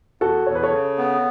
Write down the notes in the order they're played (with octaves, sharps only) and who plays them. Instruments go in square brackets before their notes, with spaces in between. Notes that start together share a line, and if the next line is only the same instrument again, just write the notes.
[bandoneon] E2 [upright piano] F#4 A4
[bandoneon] E2 [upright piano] C#5
[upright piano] B4
A4 C#5
[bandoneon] C#3
B3